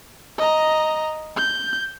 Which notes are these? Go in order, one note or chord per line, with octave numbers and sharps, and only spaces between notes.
D#5 A#5
G6